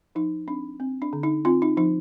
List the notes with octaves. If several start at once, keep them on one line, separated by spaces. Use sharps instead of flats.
F3 D#4
C4 D4
C4
D4
D3
D#4
C4 F4
D#4
F3 D#4